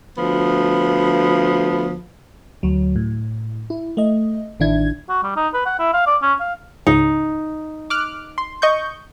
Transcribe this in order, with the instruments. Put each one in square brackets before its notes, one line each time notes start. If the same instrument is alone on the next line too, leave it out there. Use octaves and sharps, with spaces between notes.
[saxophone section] D2 F3 B3
[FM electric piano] D2 F#3
A2
E4
A3 D#5
A1 D#3 D4 E4 G#6
[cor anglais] F#4
G3
D#4
B4
F#5
E4
F5
D5
C#4
F5
[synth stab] C#2 G#2 C#3 [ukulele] D#4
[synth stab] D6 F6 F#6
C6
D#5 C#6 G6